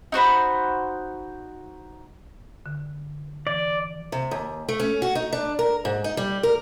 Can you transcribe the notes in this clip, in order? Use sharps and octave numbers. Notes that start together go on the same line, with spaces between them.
D#4 F#4 C5 B5
D3
E3 D5
C3
D#2
A3
C#4
F#4
D#4
D4
A#4
G#2
D#4
G3
A#4